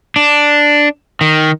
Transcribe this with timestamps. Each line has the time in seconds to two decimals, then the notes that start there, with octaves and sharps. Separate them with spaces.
0.16 D4
1.21 D#3